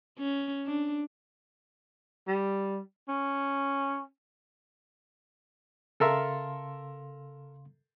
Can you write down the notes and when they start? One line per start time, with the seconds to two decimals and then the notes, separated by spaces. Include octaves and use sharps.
0.19 C#4
0.66 D4
2.28 G3
3.08 C#4
6.00 C#3 A4 A#4 E5 F5 C6